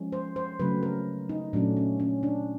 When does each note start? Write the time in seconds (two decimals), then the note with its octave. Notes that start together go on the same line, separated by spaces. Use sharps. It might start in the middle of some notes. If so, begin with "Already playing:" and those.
Already playing: F3 G#3 C#4
0.12 C5
0.36 C5
0.59 C#3 F#3 A3 C4 B4
0.83 A#4
1.29 D#4
1.53 A#2 F#3 A3 C#4 D4
1.77 C#4
2.00 C#4
2.23 D4